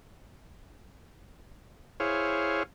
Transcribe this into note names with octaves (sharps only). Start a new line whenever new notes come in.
E4 G#4 C5 C#5 F5